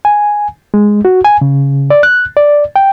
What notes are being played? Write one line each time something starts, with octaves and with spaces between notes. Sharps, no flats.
G#5
G#3
F#4
G#5
C#3
D5
F#6
D5
G5